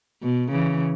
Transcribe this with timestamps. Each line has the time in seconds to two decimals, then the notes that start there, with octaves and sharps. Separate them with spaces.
0.23 B2
0.51 C#3 E3